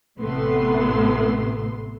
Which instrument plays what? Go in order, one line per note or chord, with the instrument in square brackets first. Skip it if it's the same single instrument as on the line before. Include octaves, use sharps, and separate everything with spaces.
[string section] A1 A2 C3 A3 B3 C6